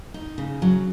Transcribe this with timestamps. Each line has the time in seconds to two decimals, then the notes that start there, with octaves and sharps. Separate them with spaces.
0.14 D#4
0.38 C#3
0.62 F#3